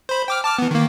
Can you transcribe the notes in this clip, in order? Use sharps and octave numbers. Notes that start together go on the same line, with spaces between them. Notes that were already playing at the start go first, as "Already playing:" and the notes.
C5 B5
G5 D6 F6
A5 D6 F6
E3 B3
D#3 A#3